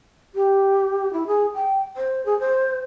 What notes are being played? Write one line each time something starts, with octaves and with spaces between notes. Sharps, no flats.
G4
E4
G#4
G5
C5
G#4
C5